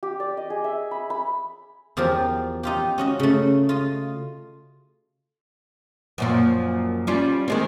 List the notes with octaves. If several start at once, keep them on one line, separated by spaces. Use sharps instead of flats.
G4
D5
D#5
G#4
E5
B5
B5
E2 F3 G4 A#4 D5
D#4 F4 G4
C#4 F#4 D#5
C#3 A3
F4 D#5
F#2 A#2 F3
G3 C#4 F4
D#3 G#3 C4